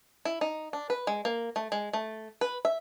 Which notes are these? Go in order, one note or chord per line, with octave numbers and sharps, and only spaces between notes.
E4
D#4
D4
B4
G#3
A#3
A3
G#3
A3
B4
E5